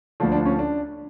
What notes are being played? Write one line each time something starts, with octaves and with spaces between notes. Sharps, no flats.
D2 D3 F3 D4
D4
C#4
D4